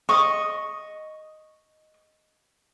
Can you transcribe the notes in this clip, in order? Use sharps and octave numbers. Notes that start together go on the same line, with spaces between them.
D#5 C#6